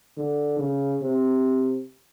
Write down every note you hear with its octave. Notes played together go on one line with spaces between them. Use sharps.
D3
C#3
C3